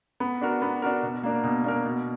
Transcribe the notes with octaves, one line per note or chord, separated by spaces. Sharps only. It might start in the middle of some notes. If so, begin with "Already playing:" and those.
B3
D4 F#4 A#4
B3
D4 F#4 A#4
B2
A#3 D4 A#4
B2
A#3 D4 A#4
B2